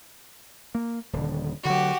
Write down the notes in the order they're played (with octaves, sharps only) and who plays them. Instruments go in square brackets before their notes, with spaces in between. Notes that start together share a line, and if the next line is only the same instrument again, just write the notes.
[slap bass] A#3
D#1 D3
[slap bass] D3 F#3 [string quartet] F#4 G4